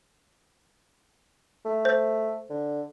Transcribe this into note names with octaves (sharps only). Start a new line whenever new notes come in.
A3
C5
D3